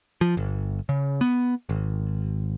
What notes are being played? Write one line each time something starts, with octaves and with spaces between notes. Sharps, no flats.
F3
G1
C#3
B3
G#1